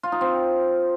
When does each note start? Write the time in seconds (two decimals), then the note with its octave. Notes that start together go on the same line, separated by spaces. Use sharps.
0.03 F4
0.12 D#4
0.21 C4